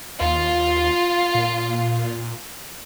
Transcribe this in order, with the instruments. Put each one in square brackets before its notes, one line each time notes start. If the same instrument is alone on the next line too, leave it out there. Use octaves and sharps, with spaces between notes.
[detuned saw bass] D#2 [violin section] F4
[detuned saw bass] A#2